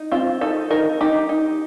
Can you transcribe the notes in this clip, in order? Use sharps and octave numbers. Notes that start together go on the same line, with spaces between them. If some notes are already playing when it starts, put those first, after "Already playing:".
Already playing: D#4
C4 F4
D#4 A4
D#4 A#4
D#4 G4
D#4